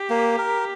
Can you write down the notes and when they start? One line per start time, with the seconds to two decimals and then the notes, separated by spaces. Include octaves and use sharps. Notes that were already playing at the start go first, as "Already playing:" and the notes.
Already playing: G4
0.10 A#3
0.38 A#4